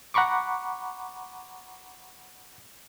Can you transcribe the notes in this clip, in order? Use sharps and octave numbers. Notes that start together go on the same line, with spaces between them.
F#5 A#5 B5 C#6 D6